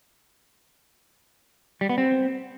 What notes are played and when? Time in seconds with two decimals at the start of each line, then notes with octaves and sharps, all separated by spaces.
1.81 G3
1.89 B3
1.98 C4